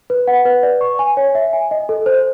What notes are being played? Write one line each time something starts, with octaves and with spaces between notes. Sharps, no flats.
B4
F#5
B4
D5
C#6
G#5
C#5
E5
G#5
D#5
A4
C5